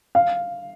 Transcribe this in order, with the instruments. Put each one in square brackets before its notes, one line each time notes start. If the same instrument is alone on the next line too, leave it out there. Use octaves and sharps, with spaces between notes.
[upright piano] F5